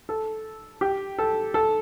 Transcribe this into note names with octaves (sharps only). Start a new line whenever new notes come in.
A4
G4
A4
A4